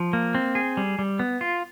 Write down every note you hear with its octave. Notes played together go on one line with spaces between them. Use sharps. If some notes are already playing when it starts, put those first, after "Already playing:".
Already playing: F3
A#3
C4
G#4
G3
G3
B3
F4